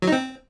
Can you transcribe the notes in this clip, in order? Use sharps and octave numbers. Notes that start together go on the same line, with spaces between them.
F#3
D#4
C4